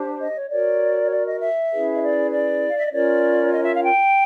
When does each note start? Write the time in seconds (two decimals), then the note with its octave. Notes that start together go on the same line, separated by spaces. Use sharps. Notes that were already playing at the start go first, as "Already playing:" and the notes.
Already playing: D4 G4 C5
0.20 D#5
0.35 C#5
0.50 F#4 A#4 C#5 D5
1.02 C#5
1.11 D5
1.26 D#5
1.41 E5
1.71 C#4 E4 G#4 B4
1.94 D#5
2.01 D5
2.31 D5
2.68 F5
2.77 E5
2.84 D#5
2.92 C#4 F4 A#4 C#5 D5
3.52 D#5
3.63 E5
3.73 F5
3.83 G5